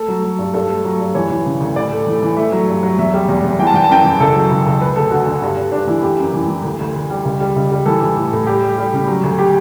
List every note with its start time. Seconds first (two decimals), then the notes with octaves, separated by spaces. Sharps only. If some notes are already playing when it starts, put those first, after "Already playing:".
Already playing: A3 A4
0.08 F#3
0.24 F#3
0.39 G2
0.54 G2 A4
0.69 A3
0.84 F#3
1.00 G2
1.15 E3 C#5
1.30 E3
1.46 C#3
1.60 D2
1.76 A2 D5
1.92 A3
2.07 E3
2.22 E3
2.37 A3 E5
2.52 F#3
2.68 G2
2.83 F#3
2.98 E2 E5
3.14 G3
3.29 E2
3.44 E2
3.59 E3 G5
3.67 A5
3.74 E3 G5
3.84 A5
3.90 F#2 G5
4.05 E3
4.20 C#2 A4
4.35 F#3
4.51 C#2
4.66 C#2
4.81 D2 B4
4.96 D2 A4
5.11 D3 F#4
5.26 D3
5.42 G2
5.57 G2
5.72 G2 D4
5.87 E3 E4
6.03 E3 G4
6.19 F#2
6.34 E3
6.48 E3
6.64 D2
6.80 D2
6.95 D2
7.10 G3
7.25 C#2
7.40 G3
7.56 C#2
7.71 G3
7.86 E3 A4
8.02 E3
8.16 A2
8.32 A2
8.47 G3 G4
8.63 G3
8.78 G3
8.93 C#3
9.08 F#3
9.23 D2
9.39 G4